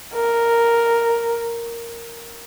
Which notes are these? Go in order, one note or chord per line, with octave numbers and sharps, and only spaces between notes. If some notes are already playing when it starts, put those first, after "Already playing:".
A#4